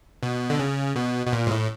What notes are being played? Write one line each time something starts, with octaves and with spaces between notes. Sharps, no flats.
B2
D3
C#3
B2
B2
A#2
G#2
A2